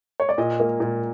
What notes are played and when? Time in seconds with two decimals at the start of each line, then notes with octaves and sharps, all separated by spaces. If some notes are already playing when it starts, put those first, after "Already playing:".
0.20 C#5
0.29 D5
0.38 A#2 D#5
0.60 A#3
0.80 A#2